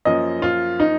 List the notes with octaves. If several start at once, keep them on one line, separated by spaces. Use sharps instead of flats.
F#2 F3 A#3 D#5
F4
D#4